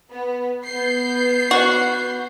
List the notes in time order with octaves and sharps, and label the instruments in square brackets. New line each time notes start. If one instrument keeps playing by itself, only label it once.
[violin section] B3
B3 G6 C7
[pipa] F#4